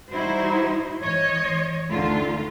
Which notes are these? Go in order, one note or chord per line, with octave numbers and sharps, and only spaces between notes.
G3 D#4 E4 F#4 C5
E3 C#5 D#5
D2 D3 D#3 A3 F4